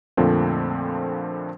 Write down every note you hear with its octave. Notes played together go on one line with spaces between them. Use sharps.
F2 A#2 D3 F3 A3 C4